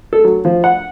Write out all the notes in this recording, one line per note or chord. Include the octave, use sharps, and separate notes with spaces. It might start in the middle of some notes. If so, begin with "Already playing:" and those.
A4
F#3
F3
F#5